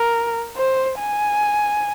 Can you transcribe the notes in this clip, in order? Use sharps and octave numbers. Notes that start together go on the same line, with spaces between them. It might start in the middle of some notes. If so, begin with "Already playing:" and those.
Already playing: A#4
C5
G#5